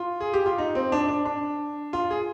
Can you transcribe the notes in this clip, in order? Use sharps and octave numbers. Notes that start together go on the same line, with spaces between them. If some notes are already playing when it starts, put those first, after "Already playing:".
Already playing: F4
G#4
G4
F4
D#4
C4
D4
D4
D4
F4
G#4